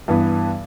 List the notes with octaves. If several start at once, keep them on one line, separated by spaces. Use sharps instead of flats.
G2 E3 B3